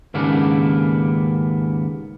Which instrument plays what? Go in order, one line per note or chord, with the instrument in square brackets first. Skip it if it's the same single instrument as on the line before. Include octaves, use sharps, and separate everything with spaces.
[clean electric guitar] D#2 G#2 C#3 A#3 B3 D4